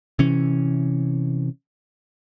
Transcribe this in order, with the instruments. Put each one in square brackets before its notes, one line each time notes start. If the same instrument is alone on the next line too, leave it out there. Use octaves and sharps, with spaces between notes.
[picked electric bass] C3 E3 C#4